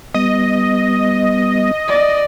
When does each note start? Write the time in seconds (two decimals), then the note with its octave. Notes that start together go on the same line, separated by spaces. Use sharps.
0.14 G3 B3 D#5
1.88 D5